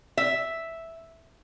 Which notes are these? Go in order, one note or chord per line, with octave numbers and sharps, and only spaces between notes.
E5